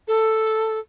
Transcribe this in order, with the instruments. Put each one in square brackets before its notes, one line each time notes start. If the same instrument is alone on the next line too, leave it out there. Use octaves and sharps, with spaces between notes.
[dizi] A4